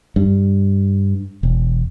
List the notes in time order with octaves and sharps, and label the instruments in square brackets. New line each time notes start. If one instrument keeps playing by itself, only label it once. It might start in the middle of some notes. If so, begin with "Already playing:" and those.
[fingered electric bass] G2
E1